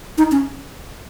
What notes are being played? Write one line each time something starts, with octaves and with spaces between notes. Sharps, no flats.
D#4
C#4